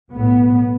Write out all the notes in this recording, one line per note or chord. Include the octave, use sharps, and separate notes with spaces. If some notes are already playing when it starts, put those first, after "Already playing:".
B1 A2 B3